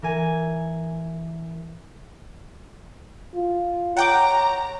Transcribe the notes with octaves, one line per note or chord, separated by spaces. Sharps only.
E3 A#4 G#5
F4
C#5 F#5 G5 A#5 D6